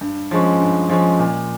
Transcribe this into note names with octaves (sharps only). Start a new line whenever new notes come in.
G2
F3 G#3 C#4
G2
F3 G#3 C#4
A#2